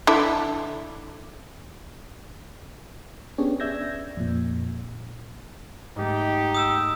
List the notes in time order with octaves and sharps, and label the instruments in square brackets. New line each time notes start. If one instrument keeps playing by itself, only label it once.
[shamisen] D3 E4
[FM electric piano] B3 C#4 D4 G4 G#4 C#5
D5 E5 E6 G6 G#6 A#6
F2 A#2
[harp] G#2 G#3 A3 [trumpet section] D#4 G4
[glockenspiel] D#6 E6 E7